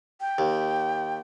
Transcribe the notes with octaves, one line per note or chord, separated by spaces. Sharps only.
G5
D#2